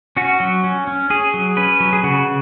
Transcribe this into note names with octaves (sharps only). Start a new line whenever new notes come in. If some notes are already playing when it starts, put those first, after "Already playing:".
C#4 F#4
F#3
C#4
C#4
C#4 G#4
F#3
C#4 B4
F#3
G#4
C#3 F#4